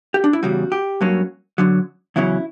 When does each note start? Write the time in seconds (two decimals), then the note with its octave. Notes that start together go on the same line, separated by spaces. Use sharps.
0.14 G4
0.24 D4
0.33 E4
0.43 E2 C#3 G3 F#4
0.72 G4
1.01 G2 F#3 A#3 C#4
1.58 F#2 D3 F#3
2.16 E2 C#3 F#3 C#4 E4